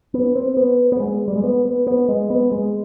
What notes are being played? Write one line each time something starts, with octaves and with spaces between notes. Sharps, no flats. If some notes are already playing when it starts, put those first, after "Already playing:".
B3
C4
B3
B3
G#3
G3
G#3
B3
B3
B3
G#3
B3
G#3